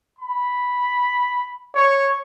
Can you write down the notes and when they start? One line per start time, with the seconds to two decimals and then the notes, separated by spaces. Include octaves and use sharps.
0.19 B5
1.75 C#5